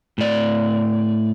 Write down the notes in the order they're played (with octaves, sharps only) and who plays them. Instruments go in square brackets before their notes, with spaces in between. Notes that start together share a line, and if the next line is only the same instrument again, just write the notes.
[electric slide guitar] A2 D5